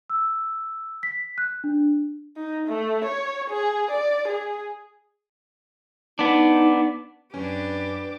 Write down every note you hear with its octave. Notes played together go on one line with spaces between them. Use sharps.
E6
B6
F#6
D4
D#4
A3
C#5
G#4
D5
G#4
B3 D4 D#4
F#2 C#4 D4 G4 B4 D6